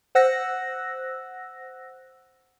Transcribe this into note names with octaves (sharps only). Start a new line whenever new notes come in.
C5 F#5 E6 F#6 A#6